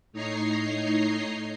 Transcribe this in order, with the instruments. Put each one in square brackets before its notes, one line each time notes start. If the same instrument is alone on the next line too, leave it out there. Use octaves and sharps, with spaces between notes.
[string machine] A2 D#4 C#5 D#5 A#5 C7